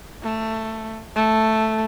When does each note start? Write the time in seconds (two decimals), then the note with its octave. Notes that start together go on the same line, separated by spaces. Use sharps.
0.23 A3
1.16 A3